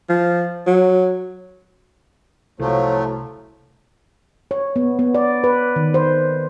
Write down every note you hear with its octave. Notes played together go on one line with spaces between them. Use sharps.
F3
F#3
C2 A2 F3 F#3 A3
C#5
B3
B3
D5
B4
D#3
C5